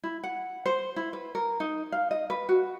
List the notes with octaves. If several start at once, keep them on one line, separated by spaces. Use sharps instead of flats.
E4
F#5
C5
E4
B4
A#4
D#4
F5
D#5
B4
F#4